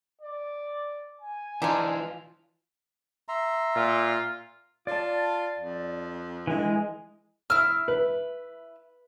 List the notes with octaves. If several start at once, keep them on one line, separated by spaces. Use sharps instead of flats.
D5
G#5
E3 D4 D#4 F4 G#4
E5 A#5 C6
A#2 F4
F4 D5 A5
F2
D3 E3 G#3 D#5
E4 E6 F6
B4